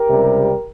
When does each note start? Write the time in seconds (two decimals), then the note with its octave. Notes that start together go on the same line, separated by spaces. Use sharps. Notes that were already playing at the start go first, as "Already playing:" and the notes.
Already playing: G4 A#4
0.09 C#2 C3 G3 C4